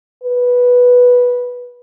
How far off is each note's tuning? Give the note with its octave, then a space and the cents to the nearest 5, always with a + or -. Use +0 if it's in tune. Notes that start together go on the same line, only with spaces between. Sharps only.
B4 -10